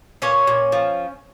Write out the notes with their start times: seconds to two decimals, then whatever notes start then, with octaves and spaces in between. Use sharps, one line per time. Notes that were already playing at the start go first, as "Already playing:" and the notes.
0.22 A#2 C#4 C#5
0.47 A#2
0.72 F3